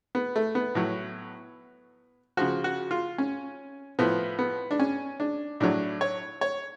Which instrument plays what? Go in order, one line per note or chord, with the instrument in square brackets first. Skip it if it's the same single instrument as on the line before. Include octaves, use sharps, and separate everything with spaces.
[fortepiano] B3
A3
B3
A2 F#3
C#3 F3 F#4
F#4
F4
C#4
A2 F3 B3
B3
D4
C#4
D4
A2 F#3 D4
C#5
C#5